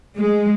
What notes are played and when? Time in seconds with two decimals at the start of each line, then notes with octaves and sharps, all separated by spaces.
0.17 G#3